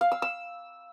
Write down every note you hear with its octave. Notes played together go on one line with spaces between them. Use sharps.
F5
E6
E6